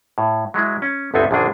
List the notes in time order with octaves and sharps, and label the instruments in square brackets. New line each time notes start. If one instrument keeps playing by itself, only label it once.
[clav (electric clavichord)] A2
F#3 G#3 E4
C#4
G1 D2 B3 C4 A4 G#5
A#1 F#2 D3 D#3 D4 G#4